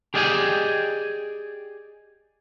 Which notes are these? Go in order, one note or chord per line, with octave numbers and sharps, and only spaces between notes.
G4 G#4 D5 D#5 G5 G#5